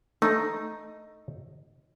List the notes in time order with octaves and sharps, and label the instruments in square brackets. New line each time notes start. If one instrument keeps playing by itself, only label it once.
[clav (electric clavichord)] A3 [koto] D#4